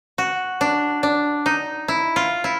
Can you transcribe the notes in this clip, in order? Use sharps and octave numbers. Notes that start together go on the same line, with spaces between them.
F#4
D4
D4
D#4
E4
F4
E4